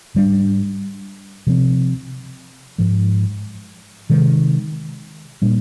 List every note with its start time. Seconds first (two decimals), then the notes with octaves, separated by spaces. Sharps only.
0.15 G#2 G3 D4
1.47 C3 F3 C4
2.78 G#2 F3 G#3
4.10 C3 D#3 G#3
5.42 A#2 G3 A#3 D4